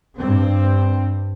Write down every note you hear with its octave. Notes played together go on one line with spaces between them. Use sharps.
G2 C4